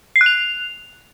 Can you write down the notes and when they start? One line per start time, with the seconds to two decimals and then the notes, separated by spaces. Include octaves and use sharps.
0.16 C7
0.21 F#6
0.26 F7